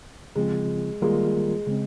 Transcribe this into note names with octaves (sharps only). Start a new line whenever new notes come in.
C#3 F3 G#3 C4 F4
D#3 G3 G#3 A#3 F4 A#4
C#3 G#3 C4